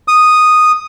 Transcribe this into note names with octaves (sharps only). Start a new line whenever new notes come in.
D#6